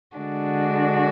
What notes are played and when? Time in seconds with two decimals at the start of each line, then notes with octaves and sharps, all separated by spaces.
0.14 D3 G#3 D4 F#4